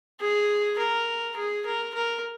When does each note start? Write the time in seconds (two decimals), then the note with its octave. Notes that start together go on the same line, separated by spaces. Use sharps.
0.20 G#4
0.78 A#4
1.37 G#4
1.66 A#4
1.94 A#4